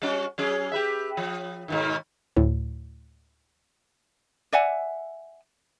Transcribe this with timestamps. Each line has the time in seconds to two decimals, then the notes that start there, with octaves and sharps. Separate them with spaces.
0.02 G3 C#4 F#4
0.38 F#3 C#4 G#4
0.72 G4 B4 E5
1.17 F3
1.68 G#2 B2 D#3
2.37 D2 A2
4.53 D5 E5 F#5 G#5